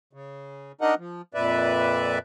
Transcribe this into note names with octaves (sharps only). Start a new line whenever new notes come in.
C#3
D4 D#4 A#4 D#5 F#5
F3
F2 A#2 B4 D5 E5